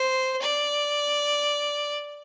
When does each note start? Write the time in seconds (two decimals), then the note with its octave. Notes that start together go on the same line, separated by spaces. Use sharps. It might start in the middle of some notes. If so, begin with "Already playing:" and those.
Already playing: C5
0.42 D5